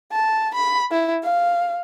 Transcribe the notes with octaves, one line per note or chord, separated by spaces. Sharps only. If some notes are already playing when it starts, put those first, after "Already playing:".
A5
B5
E4
F5